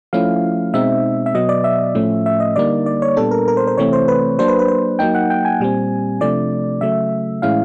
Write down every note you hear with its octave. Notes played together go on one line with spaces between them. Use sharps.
F3 A3 C#4 E4 F5
B2 G#3 C4 D#4 E5
E5
B2 F#3 B3 D#5
D5
E5
A2 F3 A3 C#4
E5
D#5
D3 G3 A#3 D#4 D5
D5
C#5
A#2 G3 B3 D4 A4
A#4
A#4
C5
C5
C3 E3 A3 C4 C#5
C5
B4
F#3 A#3 D4 C5
B4
B4
C5
F#3 A#3 D#4 G5
F#5
G5
G#5
A#2 G3 C4
C3 F3 A3 D4 D5
C#3 F#3 A3 E5
A2 E3 G#3 C#4 E4 F5